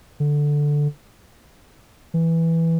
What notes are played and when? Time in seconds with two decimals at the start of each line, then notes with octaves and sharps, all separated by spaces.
0.20 D3
2.14 E3